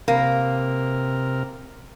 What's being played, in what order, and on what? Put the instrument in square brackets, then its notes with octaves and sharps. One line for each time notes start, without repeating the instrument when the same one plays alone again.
[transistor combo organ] C3 A#4 [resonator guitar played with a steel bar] A#3